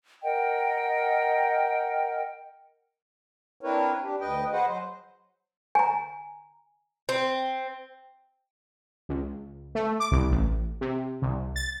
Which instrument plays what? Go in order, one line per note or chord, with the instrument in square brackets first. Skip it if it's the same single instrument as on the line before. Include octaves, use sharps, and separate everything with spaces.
[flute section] A#4 D#5 F#5 G5
[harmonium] C4 D4 E4 A#4 B4 C#5
D4 G4
D2 B4 D#5 G5
F#4 G#4 B4 C5 D#5 F#5
F#3 C5
[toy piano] G#5 A#5
[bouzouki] C4
[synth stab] C#2
A3
D6
C2
A1
C3
C2
A6